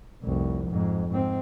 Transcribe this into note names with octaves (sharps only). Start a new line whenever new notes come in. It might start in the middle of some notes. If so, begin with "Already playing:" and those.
F1 C2
F2 G#2
G#2 C4